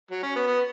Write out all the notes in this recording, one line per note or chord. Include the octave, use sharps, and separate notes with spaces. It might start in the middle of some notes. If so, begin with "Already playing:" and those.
F#3
C#4
B3
B3